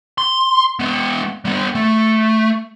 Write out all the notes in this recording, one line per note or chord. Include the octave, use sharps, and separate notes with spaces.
C6
G#3 B3
G3 B3
A3